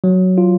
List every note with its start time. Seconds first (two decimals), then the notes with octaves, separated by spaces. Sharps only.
0.04 F#3
0.38 F4